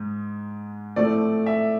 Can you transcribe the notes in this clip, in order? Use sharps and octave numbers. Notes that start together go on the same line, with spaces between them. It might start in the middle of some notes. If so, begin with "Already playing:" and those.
Already playing: G#2 G#3
A2 F3 A3 C4 D5
E5